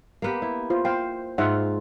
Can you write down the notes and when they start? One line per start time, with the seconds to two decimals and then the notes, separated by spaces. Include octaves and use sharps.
0.22 A#3 B3 G4
0.42 E4
0.70 F4 C5
0.85 C5 F5 G5
1.38 G#2 F4 E5 F#5